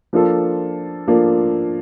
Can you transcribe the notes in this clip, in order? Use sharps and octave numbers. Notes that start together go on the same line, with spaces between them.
F3 A#3 D4 F4 A4
F3 A#3 D4 F4 A4